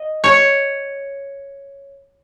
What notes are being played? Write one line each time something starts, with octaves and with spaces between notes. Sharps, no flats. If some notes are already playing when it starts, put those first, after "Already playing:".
Already playing: D#5
C#5